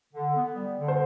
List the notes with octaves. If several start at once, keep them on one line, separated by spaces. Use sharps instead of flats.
D3
B3
G3
D3
C5